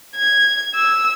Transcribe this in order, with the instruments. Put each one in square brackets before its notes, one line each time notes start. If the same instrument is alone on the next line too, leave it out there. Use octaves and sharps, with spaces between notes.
[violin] G#6
E6